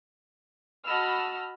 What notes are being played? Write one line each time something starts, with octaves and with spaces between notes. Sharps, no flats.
F#4 D#5 A5 B5 E6 F6